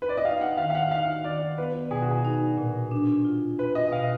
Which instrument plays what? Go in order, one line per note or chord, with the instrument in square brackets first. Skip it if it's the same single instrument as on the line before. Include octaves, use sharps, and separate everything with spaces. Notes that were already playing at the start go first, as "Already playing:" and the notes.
[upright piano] B4
D5
D#5
[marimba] D#4 [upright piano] F5
[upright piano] F#5
[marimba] D#3 [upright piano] F5
[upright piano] F5
F#5
[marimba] D#4 [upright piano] F5
[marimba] D#3 [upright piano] D5
[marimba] B3 [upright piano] B4
[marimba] B2 [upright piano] G#4
[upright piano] F#4
G#4
[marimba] D#4
A#2
D4
F4
[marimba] F4 [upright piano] B4
[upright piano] D#5
[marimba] B2 [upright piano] F5